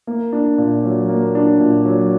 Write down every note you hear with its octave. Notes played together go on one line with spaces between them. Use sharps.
A#3
D4
A#2
F#3
A#3
D4
A#2
F#3